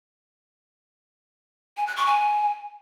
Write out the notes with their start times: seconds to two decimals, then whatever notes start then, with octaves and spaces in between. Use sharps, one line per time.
1.77 G#5
1.87 F#6
1.97 C#6
2.06 G#5